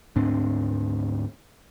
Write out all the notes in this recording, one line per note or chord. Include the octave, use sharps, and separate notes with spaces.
D2 G#2 C4 D4